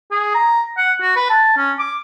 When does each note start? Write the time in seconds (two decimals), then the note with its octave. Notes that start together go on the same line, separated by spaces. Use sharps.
0.11 G#4
0.35 A#5
0.77 F#5
1.01 F#4
1.16 B4
1.30 A5
1.57 C#4
1.79 D6